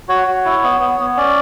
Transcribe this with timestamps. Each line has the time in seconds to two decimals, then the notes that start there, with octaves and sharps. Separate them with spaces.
0.09 F#4 C#5
0.27 F#4
0.45 E4
0.63 B3
0.80 B3
0.99 B3
1.17 C#4 D5